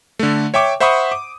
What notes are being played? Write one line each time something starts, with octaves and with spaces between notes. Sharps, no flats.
D3 A3
C#5 E5 G5 C#6 D6
C5 E5 F#5 B5 C#6 D#6
D6